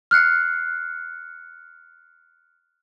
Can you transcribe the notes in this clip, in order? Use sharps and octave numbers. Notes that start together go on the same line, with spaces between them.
F6 F#6 C7 C#7